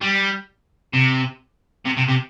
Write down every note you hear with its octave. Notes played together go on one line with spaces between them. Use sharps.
G3
C3
C3
C3
C3